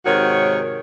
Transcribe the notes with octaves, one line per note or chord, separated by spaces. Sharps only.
G#2 C3 D#3 F#4 C#5